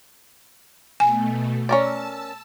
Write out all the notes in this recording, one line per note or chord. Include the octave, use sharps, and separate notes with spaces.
B2 A3 G#5
C#4 A#4 D5 A5 E6